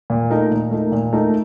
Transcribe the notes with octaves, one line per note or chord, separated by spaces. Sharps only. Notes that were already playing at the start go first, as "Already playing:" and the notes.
A#2
A3 D#4 A#4
A#2
A3 D#4 A#4
A#2
A3 D#4 A#4